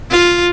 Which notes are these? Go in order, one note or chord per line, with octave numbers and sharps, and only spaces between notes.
F4